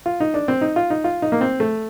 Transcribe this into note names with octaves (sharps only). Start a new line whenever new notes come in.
F4
D#4
D4
C4
D#4
F4
D#4
F4
D#4
A#3
C4
A3